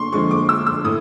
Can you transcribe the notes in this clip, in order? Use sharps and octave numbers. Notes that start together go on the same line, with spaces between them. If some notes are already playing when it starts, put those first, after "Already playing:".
Already playing: D3 C6 C#6
D3 F3 G#3 C#6
D6
E6
E6
A2 D#6